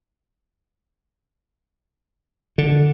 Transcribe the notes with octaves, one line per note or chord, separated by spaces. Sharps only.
D3